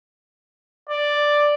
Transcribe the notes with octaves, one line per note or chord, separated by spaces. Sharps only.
D5